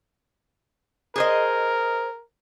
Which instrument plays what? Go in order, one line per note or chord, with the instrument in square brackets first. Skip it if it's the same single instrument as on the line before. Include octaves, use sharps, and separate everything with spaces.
[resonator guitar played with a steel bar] G#4 C5 D#5 [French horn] A#4